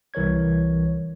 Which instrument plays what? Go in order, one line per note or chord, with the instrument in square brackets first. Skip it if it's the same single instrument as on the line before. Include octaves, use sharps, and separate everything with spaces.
[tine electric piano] C2 E3 A#4 C#5 G#6